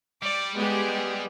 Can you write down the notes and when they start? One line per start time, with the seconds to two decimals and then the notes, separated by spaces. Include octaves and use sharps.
0.22 G3 D5
0.57 G#3 B3 G4 G#4